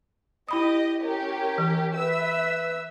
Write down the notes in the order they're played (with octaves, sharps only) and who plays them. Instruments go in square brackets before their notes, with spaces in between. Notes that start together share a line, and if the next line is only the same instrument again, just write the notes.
[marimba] E4 B5 D#6 [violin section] G4 D#5
[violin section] C#4 G4 A#4
[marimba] E3
[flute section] B4 [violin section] E5 E6